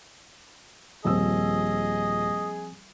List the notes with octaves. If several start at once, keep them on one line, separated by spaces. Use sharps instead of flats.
D#1 F3 C4 G#4 D#5 E6